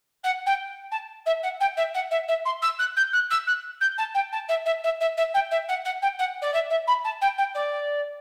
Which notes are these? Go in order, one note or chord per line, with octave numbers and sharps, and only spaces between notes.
F#5
G5
A5
E5
F#5
G5
E5
F#5
E5
E5
C6
E6
F#6
G6
F#6
E6
F#6
G6
A5
G5
A5
E5
E5
E5
E5
E5
G5
E5
F#5
F#5
G5
F#5
D5
E5
E5
B5
A5
G5
G5
D5